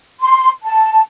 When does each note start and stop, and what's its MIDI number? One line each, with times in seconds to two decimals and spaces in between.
0.20 0.50 84
0.64 1.00 81